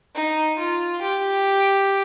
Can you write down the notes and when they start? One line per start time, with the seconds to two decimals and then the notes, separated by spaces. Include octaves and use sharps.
0.15 D#4
0.58 F4
1.01 G4